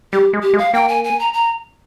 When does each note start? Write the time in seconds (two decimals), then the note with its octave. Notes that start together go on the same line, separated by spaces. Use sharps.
0.13 G3 G4
0.33 G#3
0.43 G4
0.53 G#3
0.58 F5
0.74 A#3 G5
0.89 G#5
1.04 G#5
1.19 A#5
1.33 A#5